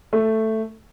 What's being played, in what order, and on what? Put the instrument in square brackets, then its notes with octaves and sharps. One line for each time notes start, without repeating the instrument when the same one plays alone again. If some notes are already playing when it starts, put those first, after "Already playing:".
[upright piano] A3